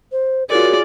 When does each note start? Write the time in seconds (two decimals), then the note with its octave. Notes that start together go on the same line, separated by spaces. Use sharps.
0.12 C5
0.50 F4 F#4 G#4 A#4 C#5 D5